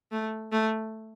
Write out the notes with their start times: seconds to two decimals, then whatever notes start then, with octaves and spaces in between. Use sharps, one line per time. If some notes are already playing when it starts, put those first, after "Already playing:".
0.12 A3
0.52 A3